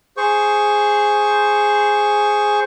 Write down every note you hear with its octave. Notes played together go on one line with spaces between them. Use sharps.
G#4 C5 C#6